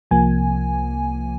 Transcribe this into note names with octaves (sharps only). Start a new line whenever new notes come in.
C2 C3 F3 A#3 G#5